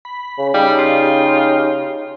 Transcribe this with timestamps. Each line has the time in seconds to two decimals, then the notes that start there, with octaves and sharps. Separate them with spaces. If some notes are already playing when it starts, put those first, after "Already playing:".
0.05 B5
0.38 C#3
0.54 C#3 G3 D#4 G4
0.79 F4